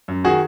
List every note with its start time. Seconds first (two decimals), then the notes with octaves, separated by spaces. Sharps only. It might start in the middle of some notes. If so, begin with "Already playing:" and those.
0.08 F#2
0.24 D#3 F#4 G#4